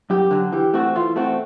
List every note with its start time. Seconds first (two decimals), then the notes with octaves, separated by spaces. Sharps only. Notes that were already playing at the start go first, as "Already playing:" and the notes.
0.10 F#2 G4
0.31 D3 F#3
0.52 E3 G4
0.74 A3 C4 F#4
0.95 E3 F4
1.16 A3 C4 F#4